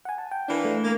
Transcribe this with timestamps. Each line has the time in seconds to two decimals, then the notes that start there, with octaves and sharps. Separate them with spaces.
0.05 F#5 G#5
0.18 A5
0.31 G5
0.48 E3 A#3 D4
0.65 A3
0.84 A#3